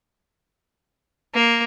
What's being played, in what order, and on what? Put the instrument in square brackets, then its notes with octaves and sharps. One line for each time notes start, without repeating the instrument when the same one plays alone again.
[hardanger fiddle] A#3